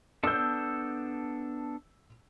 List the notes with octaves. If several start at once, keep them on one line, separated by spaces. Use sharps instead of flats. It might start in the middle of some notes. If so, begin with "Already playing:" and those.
B3 D4 A4 E6 G6